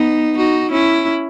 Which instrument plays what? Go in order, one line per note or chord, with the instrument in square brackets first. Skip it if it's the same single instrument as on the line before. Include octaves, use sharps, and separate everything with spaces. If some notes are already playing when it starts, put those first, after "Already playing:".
Already playing: [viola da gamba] B3 D#4
D#4 F#4
C#4 E4